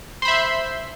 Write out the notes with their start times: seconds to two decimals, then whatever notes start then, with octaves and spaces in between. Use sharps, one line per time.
0.22 C5
0.25 B5
0.28 E5
0.31 C6